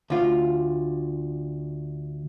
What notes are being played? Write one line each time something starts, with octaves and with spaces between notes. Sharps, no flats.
D2 F4